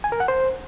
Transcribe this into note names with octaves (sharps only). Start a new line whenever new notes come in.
G#5
A#4
F#5
C5